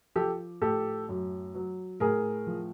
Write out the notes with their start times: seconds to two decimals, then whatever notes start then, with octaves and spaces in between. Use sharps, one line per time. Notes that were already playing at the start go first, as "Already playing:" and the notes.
0.16 F3 G4 A4
0.61 A2 G4 A4
1.09 F#2
1.55 F#3
2.00 A2 G#4 A#4
2.47 F3